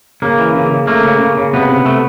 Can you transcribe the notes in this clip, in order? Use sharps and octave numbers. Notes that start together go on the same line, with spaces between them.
C#3 A#3
E3
C#3
C#3
A3 A#3
C#3
C#3
C#3
C3 B3
C3
A3